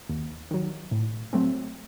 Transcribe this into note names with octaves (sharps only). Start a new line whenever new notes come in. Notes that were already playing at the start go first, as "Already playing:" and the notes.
D#2
D#3 F#3
A2
F#3 A3 C4